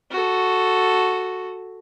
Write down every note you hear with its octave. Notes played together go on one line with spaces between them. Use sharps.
F#4 A4